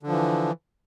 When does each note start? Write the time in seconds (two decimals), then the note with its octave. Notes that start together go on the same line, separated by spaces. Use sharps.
0.03 D3
0.07 F3
0.11 E3